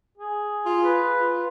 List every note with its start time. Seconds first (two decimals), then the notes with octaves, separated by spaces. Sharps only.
0.17 G#4
0.65 F4
0.84 B4
1.20 F4